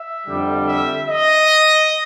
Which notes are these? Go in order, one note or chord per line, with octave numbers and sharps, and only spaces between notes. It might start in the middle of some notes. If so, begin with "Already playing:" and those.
Already playing: E5
F2 D3 G3
E5
D#5